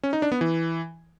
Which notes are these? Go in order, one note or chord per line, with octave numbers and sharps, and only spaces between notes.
C#4
D#4
D4
B3
E3